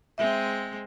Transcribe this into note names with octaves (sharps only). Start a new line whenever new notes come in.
G#3 C4 E5